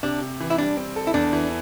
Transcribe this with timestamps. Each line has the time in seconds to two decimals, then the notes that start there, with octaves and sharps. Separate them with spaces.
0.03 C3 D4
0.21 C3
0.40 E3
0.50 E4
0.58 G3 D4
0.77 C4
0.96 A4
1.07 E4
1.14 E2 D4
1.33 E3